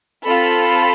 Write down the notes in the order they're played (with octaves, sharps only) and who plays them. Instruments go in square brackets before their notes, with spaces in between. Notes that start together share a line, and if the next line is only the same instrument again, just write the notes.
[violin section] C4 F4 A4 B5